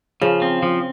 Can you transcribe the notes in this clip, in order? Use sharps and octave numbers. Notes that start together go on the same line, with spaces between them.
C#3 F3
C4
F3